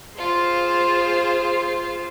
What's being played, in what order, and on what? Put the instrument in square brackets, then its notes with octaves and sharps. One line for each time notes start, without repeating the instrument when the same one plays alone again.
[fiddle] F4 [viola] G#4 C5